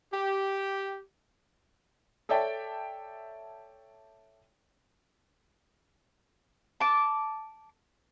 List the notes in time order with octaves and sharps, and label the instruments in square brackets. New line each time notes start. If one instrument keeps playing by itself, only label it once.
[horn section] G4
[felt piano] A4 C#5 D5 E5 G5 A5
[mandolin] A5 D6